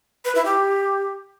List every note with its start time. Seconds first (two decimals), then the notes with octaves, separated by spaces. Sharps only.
0.25 B4
0.35 E4
0.45 G4